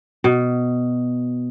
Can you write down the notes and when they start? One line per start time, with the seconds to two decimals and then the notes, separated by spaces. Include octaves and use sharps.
0.24 B2